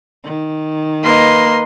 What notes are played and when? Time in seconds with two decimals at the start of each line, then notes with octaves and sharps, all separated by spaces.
0.24 D#3
1.04 A#3 B4 D#5 C6